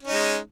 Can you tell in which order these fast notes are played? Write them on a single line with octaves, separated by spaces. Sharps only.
C#4 D#4 G#3